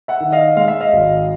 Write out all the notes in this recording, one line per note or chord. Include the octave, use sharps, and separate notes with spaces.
E5 F#5
D#3
D#5 F5
G#3 F5
E5
D#5 F5
G#1